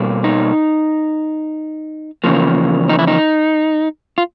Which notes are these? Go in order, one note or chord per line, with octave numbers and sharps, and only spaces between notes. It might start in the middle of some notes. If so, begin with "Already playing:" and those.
Already playing: B2 G3 A#3
D#4
E2 C#3 F3 A#3
D#4
E4
D#4
F4